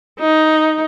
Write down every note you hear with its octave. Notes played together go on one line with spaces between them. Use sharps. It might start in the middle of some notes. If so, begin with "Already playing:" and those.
D#4